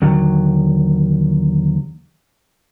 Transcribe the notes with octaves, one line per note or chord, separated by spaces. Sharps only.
D#2 D3 F#3